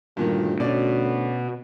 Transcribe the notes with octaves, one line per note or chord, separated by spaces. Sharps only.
D2 G2 A#2 D#3
B2 C#4 D5